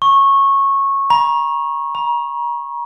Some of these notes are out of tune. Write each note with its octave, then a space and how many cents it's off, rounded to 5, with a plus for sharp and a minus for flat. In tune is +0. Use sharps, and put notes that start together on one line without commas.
C#6 -15
A#5 +35
A#5 +40